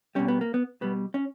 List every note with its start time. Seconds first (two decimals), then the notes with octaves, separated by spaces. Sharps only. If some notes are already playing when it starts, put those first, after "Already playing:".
0.15 B2 G3 C#4
0.28 B3
0.41 A#3
0.54 B3
0.81 B2 G3 B3
1.14 C#4